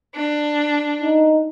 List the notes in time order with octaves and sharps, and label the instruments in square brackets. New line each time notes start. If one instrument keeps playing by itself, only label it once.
[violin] D4
[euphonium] D#4